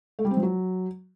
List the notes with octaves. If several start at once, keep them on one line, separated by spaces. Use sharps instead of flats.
A3
G3
C4
F3
F#3